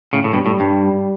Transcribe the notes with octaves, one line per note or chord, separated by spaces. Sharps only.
A2 C#3
A2
G2 B2 G3
A2
G2